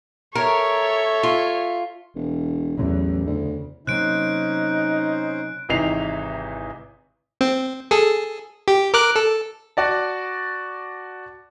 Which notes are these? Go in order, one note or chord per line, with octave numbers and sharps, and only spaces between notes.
A4 A#4 C#5 E5
F4
E1
A1 E2 F#3
D2 C#3
C3 F#3 A#3 C#4 D#4 C5 F#6 D7
G#1 C3 E3 D#4 C7 F7
C4
G#4 A4
G4
A#4 D6 F#6
A4
F#4 D5 A5